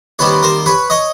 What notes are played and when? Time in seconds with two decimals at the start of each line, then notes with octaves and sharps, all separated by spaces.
0.19 D#2 D#3 G3 C4 B4 C#5
0.43 A#4 C5
0.66 B4 C#5
0.90 C#5 D#5